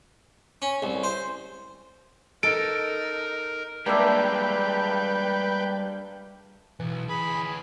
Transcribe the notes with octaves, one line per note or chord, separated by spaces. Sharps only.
C#4
C2
C5
D#4 A4 A#4 D7
G3 G#3 A#3 D4 B4 E5 G5
B1 E3
D2 G#4 B4 B5